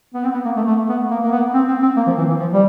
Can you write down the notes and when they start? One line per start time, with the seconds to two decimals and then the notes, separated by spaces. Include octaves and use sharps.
0.14 B3
0.24 C4
0.34 B3
0.45 A#3
0.57 A3
0.67 A3
0.89 B3
1.11 A#3
1.23 A#3
1.32 B3
1.54 C4
1.68 C4
1.83 C4
1.97 A#3
2.07 F3
2.18 E3
2.29 E3
2.39 F3
2.53 G3